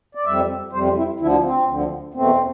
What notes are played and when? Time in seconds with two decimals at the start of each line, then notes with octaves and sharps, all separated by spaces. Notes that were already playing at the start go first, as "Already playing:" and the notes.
0.15 D5
0.25 F2 C3 G3 E5
0.72 F2 C3 G3 C5
0.96 E4
1.20 D2 D3 F3 E4
1.43 C4
1.67 D2 D3 F3
2.14 E2 B2 A3 C4